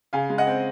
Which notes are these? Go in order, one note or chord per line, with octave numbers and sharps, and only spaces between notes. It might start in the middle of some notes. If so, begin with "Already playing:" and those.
C#3 F5 G#5
G#3
D#5 F#5
C4